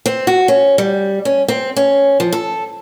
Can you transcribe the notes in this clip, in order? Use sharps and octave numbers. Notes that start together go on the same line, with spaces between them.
C4
F#4
C#4
G3
C#4
C4
C#4
F3
A4